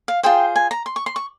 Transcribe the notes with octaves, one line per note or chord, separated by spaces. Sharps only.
F5
F4 G#4 C5 G5
G#5
A#5
C6
C#6
C6
C#6